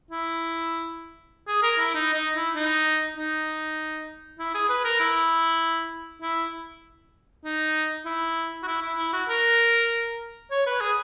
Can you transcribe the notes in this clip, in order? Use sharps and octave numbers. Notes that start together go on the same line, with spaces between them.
E4
G#4
A#4
E4
D#4
D#4
E4
D#4
D#4
E4
G#4
B4
A#4
E4
E4
D#4
E4
F#4
E4
E4
E4
F#4
A#4
C#5
B4
G#4